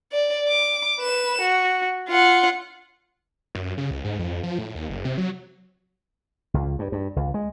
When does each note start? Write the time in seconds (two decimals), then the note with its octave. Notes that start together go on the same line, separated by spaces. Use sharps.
0.13 D5
0.48 D6
0.99 B4 E7
1.42 F#4
2.09 F4 F#5
3.55 F#2
3.78 C#3
3.91 C#2
4.04 G#2
4.19 F2
4.43 F3
4.58 A2
4.75 D#2
4.90 F#1
5.05 C3
5.18 F#3
6.54 C#2
6.79 G2
6.92 G2
7.16 C#2
7.34 G#3